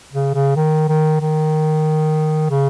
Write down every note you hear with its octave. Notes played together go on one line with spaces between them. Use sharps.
C#3
C#3
D#3
D#3
D#3
C#3